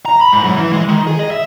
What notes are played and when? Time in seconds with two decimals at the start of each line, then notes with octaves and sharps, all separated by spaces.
0.06 A#5
0.21 B5
0.32 G#2
0.44 F#2
0.55 E3
0.73 G#3
0.88 D#3
1.07 G#4
1.19 D#5
1.31 E5